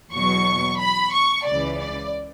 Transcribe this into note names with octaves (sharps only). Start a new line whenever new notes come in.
E2 B2 F#3 C#6
B5
C#6
C#2 C#3 E3 D5
D5